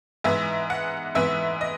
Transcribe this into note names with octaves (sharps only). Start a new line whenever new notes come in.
G#2 E3 B3 E5
F#5
G#2 E3 B3 E5
D#5